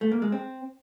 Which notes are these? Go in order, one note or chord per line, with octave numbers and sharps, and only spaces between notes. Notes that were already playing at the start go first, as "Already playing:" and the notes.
A3
A#3
G#3
C4